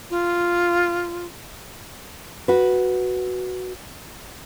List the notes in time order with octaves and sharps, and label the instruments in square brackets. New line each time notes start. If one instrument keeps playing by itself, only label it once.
[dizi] F4
[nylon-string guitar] F#4 B4